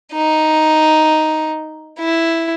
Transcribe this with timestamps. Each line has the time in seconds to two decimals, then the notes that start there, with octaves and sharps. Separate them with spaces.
0.13 D#4
1.99 E4